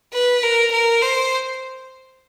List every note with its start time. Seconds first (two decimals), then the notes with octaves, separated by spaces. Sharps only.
0.13 B4
0.43 A#4
0.72 A#4
1.02 C5